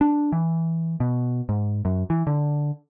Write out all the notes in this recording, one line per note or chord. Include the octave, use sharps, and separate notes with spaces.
D4
E3
B2
G#2
F#2
E3
D3